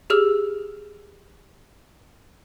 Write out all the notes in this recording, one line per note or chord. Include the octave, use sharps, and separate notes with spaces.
G4 G#4 E6 F6